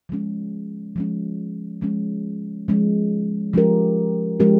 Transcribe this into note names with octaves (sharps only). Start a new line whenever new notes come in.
F3 G#3 C#4
F3 G#3 C#4
F3 G#3 C#4
F3 G#3 C#4
F3 G#3 C#4 G4 A#4
F3 G#3 C#4 G4 A#4